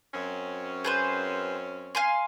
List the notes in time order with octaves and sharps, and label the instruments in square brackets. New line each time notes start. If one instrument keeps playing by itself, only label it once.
[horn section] F#2 C4 C#4
[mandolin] G#4 B4 C5
F5 G#5 C6